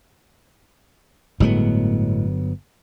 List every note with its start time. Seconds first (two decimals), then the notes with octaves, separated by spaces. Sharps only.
1.40 G1 A2 F#3 G#3 B3